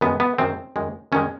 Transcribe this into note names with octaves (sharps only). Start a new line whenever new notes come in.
F#2 D#3 G#3 B3
B3
F#2 D#3 G#3 C4
F#2 D#3 G#3
F#2 D#3 G#3 C#4